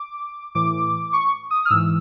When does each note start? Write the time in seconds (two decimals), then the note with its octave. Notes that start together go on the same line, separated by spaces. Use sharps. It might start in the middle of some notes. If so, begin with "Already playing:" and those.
Already playing: D6
0.55 A2 E3 D6
1.13 C#6
1.51 D#6
1.65 F6
1.70 G#2 E3 E6